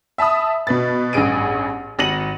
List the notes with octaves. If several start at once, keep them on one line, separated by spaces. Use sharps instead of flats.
E5 A5 B5 D#6
B2 B4 A6
A1 G2 G#4 D7 D#7
G#1 A#6 C#7 D#7 F#7